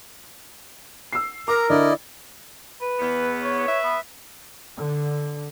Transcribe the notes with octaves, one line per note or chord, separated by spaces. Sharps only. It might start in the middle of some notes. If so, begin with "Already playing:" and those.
E6 C7
A#4 A#5 D6
D3 E4 D5 D#5
B4
E2 B3
C#5
B4 E5
B3
D3